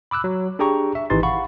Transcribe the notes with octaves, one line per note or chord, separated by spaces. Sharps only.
B5 D6 E6 F#6
F#3
D4 G4 G#4 G5 A#5 C#6
E5
G#1 E3 D#4 G4 C6 A6
F5 F#5 B5 C#6